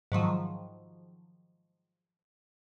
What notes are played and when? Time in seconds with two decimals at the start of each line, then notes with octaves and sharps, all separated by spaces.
0.12 G#2 D#3 F3 F#3